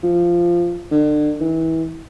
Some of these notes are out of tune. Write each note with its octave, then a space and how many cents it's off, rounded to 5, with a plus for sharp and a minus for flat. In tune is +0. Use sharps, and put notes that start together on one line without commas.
F3 -10
D3 +35
E3 -30